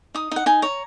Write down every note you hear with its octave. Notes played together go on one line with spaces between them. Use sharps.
D#4 D#6
D#4 F#5
D#4 G#5
C#5 A#5